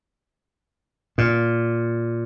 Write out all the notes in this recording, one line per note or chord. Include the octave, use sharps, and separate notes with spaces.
A#2